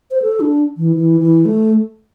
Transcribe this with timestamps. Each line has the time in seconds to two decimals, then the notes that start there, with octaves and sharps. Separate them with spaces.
0.11 C5
0.22 A4
0.40 D4
0.77 E3
0.96 E3
1.20 E3
1.45 A3